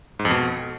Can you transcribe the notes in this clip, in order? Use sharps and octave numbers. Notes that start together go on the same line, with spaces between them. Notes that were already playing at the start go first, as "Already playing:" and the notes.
G#2
F2
B2